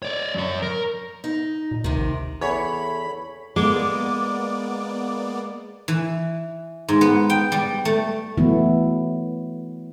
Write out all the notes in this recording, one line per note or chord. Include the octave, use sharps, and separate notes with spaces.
C#5 D5
F#2 C#5
A#4
D#4
A#2
D2 C3 D#3
A#1
E2 A4 C#5 B5
G#3 A#3 B3 D5 D6
E3
G#2
B3
G5
G3
A3
E3 F#3 A3 B3 E4